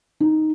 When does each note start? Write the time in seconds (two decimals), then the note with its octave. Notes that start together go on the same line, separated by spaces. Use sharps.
0.20 D#4